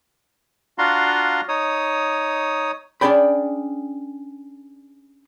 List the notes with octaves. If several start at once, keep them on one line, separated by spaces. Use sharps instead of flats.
D4 F4 F#4 F5 A#5 C6
D#4 C#5 D#6
C#4 D4 G#4 D5 G5 B5